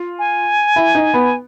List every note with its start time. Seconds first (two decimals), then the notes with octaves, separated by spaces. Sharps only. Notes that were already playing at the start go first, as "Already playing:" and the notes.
Already playing: F4
0.19 G#5
0.76 E4
0.95 D#4
1.14 B3